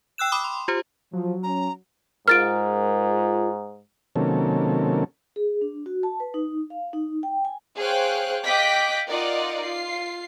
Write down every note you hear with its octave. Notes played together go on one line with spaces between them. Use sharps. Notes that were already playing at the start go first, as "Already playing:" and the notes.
G5 E6 F#6 E7
B5 D6 D#6
C6
F4 G4 C5
F3 F#3
C#4 A#5
G#2 F4 G#4 A#4 F6 A6 D7
C3 D#3 F#3 A#3 C#4 A4
G#4
D4
F#4
A5
B4
D#4
F5
D#4
G5
G#5
G#4 C5 C#5 F5 G5 F#6
D#5 F5 G5 D6 F#6 B6
D#4 F4 A#4 D5 D#5 F#5
F4 C7